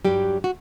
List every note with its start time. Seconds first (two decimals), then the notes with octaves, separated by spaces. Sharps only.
0.05 G2 F#3 G3 G4
0.44 F#4